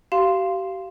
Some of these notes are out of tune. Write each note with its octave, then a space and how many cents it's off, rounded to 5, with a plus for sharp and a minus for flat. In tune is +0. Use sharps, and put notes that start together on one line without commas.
G4 -40 F5 -15 C6 +0